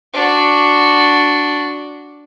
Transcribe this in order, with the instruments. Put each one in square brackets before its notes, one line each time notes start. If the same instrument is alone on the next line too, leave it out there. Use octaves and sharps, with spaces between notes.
[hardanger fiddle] D4 F#4